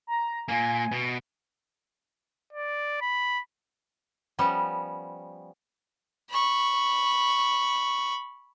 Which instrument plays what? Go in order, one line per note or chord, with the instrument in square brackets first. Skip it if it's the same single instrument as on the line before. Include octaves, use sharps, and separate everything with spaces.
[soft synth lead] A#5
[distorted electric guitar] A#2 A#3 [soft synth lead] G#5
[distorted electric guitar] B2
[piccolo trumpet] D5
B5
[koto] F3 G3 B3 C#4
[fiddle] B5 C#6